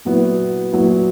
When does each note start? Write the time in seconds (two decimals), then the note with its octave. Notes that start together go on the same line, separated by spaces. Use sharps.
0.05 A#2 F#3 B3 E4
0.72 A#2 F#3 B3 E4